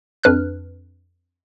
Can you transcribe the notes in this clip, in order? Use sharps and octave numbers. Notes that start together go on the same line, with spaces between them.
F2 D4 B4 F6 F#6